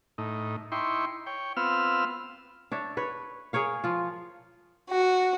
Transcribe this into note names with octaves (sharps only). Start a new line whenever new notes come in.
A2 D#4
D#4 E4 G5 C6 C#6
C#5 G5
B3 C4 F4 E6 F6
D4 C#5 E5
B4 C#5
G#4 A#4 C#5 F5
F3 F4
F#4